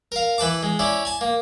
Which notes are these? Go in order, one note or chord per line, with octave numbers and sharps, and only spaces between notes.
A#4 F5
E3 B4 A5 D6
G#3
C#4 E4 D5
G#5 A5
A#3